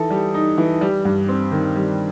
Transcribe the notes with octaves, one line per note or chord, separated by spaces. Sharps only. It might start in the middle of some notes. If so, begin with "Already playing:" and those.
Already playing: E3 D#4 A4
G3
D#4
E3
G3
G2
C4
D#3
G3